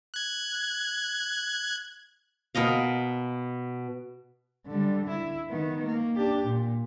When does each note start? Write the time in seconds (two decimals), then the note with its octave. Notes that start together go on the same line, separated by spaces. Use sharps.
0.14 F#6 G#6
2.55 B2 A#4 D#5 F5
4.67 D3 G3
5.09 E4
5.51 D#3 B3
5.86 A#3
6.16 D4 G4
6.46 A#2